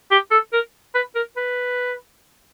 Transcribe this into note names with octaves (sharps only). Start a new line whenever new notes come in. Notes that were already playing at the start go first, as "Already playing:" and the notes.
G4
A4
A#4
B4
A#4
B4